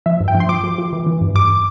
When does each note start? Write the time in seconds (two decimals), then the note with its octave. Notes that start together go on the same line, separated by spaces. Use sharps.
0.06 F3 E5
0.20 G2
0.28 G5
0.35 F3
0.40 C6
0.49 F3 D6
0.64 F3
0.78 F3
0.93 E3
1.07 E3
1.21 G2
1.35 G2 D6